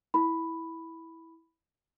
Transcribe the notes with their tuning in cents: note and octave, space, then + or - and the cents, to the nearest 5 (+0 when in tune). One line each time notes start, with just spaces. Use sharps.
E4 -10 B5 +0